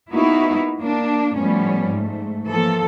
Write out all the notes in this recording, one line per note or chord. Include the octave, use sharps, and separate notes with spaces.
A#3 B3 D#4 E4 F#4
A#3 D4
A2 F3 G3 B3 C#4
G#2 A3
E3 F3 A#3 A4